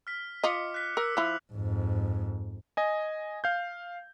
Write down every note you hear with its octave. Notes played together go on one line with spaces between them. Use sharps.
F6 B6
F4 D#5 D6 B6 C#7
F#6 B6
A#4 E6
F3 E4 F#6 F7
F2 G#2
D#5 G#5
F5 G6